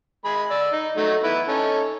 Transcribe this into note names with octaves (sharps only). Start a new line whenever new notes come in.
G#3 G#4 B5
D5 E6
D#4
F#3 A3 D#4
B3 E4 B4
C#4 D#4 A4